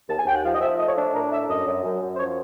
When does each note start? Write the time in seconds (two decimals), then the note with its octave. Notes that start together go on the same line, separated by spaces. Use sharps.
0.08 D#2 A5
0.18 G#5
0.25 D#2 G5
0.35 F#5
0.43 F3 F5
0.53 D#5
0.61 F3 E5
0.78 A3 D#5
0.87 C#5
0.96 D4
1.14 A2 A#4
1.31 D4 E5
1.49 F#2 D#5
1.66 F#2
1.83 F#2
2.01 F#2
2.14 C5
2.18 F3 C#5